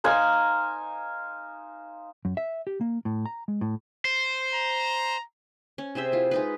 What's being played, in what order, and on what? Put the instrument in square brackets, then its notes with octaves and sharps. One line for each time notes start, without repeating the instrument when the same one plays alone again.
[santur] D#4 C5 F5 G#5
[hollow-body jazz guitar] F#2
E5
G4
A#3
A2
A#5
G#3
A2
[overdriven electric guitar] C5
[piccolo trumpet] A#5
[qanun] C#4
C3 G#4 C5 E5
E4 F4
G#3 D#4 B4